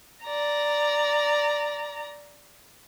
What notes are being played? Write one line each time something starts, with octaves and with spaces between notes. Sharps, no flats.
D5 A#5